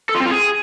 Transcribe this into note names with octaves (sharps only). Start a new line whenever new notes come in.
A4
F4
C4
F4
G#4